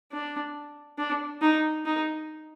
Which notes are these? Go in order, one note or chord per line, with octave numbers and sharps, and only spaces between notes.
D4
D4
D#4
D#4